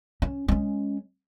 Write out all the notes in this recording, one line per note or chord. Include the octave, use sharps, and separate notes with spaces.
C#4
G#3 C#4